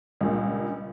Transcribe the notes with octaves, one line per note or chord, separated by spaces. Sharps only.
C#2 G2 A#2